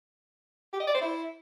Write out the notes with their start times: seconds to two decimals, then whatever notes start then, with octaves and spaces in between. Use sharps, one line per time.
0.73 G4
0.80 D#5
0.87 D5
0.94 C5
1.01 E4